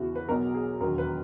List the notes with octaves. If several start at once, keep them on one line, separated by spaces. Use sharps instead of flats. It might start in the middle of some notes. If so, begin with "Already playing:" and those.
Already playing: E2 C#3 E3 F#4
B4
B1 B2 F#3 A#4
G#4
E1 D#2 D#3 F#3 A#4
B4